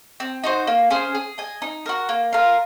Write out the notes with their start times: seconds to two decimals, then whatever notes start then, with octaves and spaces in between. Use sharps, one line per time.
0.20 C4
0.44 D#4 F#4 C5
0.67 A#3
0.90 C#4 G#4 C5
1.15 G#4
1.38 D#5 G#5
1.62 D#4
1.86 F#4 A#4
2.09 A#3
2.33 F4 A#4 F5